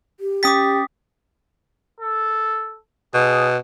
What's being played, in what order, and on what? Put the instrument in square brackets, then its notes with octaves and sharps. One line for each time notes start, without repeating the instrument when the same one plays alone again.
[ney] G4
[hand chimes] C#4 G5 A6 [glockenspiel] D6 D#6 B6
[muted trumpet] A4
[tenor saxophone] B2 [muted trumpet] G#4